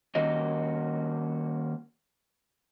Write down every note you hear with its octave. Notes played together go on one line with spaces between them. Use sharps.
D#3 G3 A#3 C#4 F#4 D#5